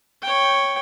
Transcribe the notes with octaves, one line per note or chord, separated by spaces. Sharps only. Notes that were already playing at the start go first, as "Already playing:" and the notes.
C#5 G5